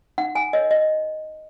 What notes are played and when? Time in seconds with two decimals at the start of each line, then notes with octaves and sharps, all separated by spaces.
0.18 D#4 F#5
0.35 G#5
0.53 A#4 C#5 D#5
0.71 D#5